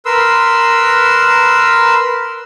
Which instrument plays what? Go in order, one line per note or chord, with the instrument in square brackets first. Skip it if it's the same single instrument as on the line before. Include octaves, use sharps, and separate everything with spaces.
[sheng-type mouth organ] A#4 B4 C6 E6